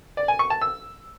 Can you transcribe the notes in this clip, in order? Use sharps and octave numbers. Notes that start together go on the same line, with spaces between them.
D5
G#5
C#6
A5
E6